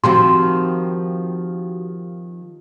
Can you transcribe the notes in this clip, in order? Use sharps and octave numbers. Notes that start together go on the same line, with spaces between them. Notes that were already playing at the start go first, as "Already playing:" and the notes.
D#3 F3 C4 F#4 G4 F5 C6